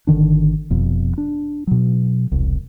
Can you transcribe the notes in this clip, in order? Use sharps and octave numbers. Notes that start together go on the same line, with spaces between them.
G#1 D3 D#3 D4
F1 F2 B2
D4
B2 F#3
E1 C2